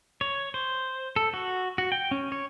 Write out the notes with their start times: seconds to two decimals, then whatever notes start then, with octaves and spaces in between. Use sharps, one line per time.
0.21 C#5
0.54 C5
1.16 A4
1.34 F#4
1.78 F#4
1.92 G5
2.11 C#4
2.32 C#5